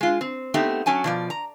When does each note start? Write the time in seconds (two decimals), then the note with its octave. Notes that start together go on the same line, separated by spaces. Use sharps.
0.01 G#3 F4
0.21 C4
0.54 A3 B3 C4 D#4 G4 E5
0.86 F#3 C#4 G#5 A5
1.04 B2 F3 D5
1.30 A#5